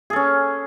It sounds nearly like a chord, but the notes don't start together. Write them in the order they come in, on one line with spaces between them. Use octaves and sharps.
G#4 A4 C#4